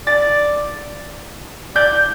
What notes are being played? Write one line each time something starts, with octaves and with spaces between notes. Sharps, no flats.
D5 A6
D5 G6